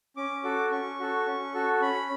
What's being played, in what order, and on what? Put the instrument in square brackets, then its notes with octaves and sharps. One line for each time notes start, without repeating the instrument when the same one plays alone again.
[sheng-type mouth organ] C#4 D6
F#4 A4
C#4 C#6
F#4 A4
C#4
F#4 A4
C#4 B5